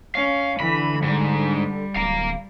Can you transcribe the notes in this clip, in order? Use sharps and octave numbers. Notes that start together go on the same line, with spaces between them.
C#4 F5
D3 E3 B5
G#2 G3
D1 F5 A#5